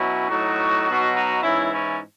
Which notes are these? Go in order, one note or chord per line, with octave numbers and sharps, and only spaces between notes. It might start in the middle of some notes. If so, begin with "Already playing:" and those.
Already playing: B2 F#3 C#4 E4
A2 F#3 D#4 F#4
B2 F#3
D#4 F#4
G#2 E3 C#4 E4
C#4 E4